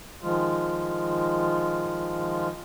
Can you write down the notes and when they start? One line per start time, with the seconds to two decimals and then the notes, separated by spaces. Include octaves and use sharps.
0.22 D#3 F3 G#3 F4